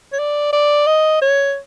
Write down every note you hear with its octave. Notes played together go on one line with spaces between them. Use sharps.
C#5
D5
D5
D#5
C#5